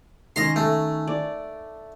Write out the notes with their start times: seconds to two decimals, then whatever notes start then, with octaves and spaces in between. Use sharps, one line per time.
0.36 D#3 C#4 D#5 A#5 C6
0.56 A3
1.07 D5